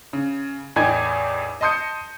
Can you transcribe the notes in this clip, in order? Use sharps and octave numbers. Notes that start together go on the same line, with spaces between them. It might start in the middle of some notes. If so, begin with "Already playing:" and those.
C#3
E2 A2 D#4 G5 G#5 G#6
D#5 A5 C6 D#6 G6 C#7